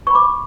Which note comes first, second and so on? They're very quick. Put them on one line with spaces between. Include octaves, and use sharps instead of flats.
C#6 B5 D6